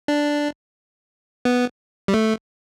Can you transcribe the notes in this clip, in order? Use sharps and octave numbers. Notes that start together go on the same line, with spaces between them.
D4
B3
G3
A3